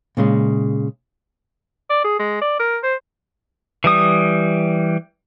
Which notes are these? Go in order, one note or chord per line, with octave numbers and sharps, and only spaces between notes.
A#2 C#3 G#3
D5
G#4
G#3
D5
A#4
C5
E3 G3 D#6